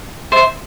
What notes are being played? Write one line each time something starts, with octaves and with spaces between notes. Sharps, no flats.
C5 E5